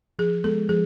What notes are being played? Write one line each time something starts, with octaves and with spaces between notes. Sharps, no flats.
F3 G#4
G#3 B3 A4
F3 G#4